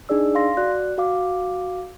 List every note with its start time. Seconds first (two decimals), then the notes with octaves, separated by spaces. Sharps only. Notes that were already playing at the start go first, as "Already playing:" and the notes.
0.09 D4 D#4 G#4 D5 E6
0.35 F5 C6 A#6
0.57 F#4 D5 F#6
0.98 F#4 F5 D6